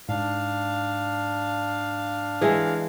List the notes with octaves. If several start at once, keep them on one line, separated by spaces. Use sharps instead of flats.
G#2 D4 F5
E3 G#3